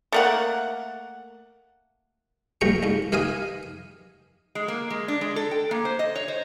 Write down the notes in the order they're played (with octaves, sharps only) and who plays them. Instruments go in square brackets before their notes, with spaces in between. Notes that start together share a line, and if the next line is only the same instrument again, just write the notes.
[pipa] A3 A#3 F#5
[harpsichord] A#1 G2 G5 A#5 C#6
C2 G#2
D#3 G4 B4 F5 G#5 D#6
[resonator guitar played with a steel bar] G#3
A#3
G#3
D4
G#3
A4
G5
A#3
C5
D#5
C#5
C5